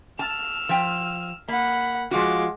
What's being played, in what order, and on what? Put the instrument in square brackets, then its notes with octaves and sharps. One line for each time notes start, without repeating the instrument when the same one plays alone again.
[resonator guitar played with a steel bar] A5 [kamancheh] E6 F6
[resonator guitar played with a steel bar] F3 G5
[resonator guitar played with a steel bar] A#3 [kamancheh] F#5 B5
[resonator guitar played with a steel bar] F3 F4 F#4 [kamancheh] G#3 D6